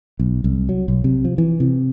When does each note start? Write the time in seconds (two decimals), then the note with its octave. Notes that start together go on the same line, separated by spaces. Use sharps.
0.19 B1
0.44 C2
0.69 F#3
0.88 B1
1.04 C3
1.25 F3
1.38 E3
1.60 C3